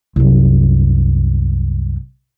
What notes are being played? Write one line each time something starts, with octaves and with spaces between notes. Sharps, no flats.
C2 F#2